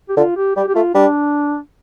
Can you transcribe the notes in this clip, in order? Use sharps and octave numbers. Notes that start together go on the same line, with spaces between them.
G4
D3 F4
G4
G3 G4
G4
A3 F4
G3 D4